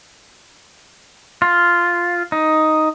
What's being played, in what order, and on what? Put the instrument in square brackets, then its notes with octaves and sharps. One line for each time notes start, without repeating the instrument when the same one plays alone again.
[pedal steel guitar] F4
D#4